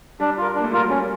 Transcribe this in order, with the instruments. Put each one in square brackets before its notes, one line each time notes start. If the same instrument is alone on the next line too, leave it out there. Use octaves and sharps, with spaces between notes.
[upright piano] G3 [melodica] D4
[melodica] F4 A#4
[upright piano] A#3 [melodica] D4
[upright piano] A3
[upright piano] G3 [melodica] F4 A#4
[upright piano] F#3
[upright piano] G3 [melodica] C#4